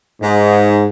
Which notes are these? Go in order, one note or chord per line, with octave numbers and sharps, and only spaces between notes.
G#2